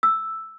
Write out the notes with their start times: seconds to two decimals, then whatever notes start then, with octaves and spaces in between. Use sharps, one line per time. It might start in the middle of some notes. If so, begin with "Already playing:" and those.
0.03 E6